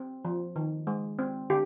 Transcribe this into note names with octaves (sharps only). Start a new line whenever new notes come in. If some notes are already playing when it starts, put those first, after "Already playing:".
Already playing: C4
F3
D#3
G#3
C4
D3 G4